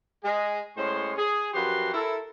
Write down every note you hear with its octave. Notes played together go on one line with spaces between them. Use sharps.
G#3 G#4
A2 G#3 C#4 C5 C#5 C6
G#4
F#2 F3 F#4 G4 B4 C6
E4 A4 A#4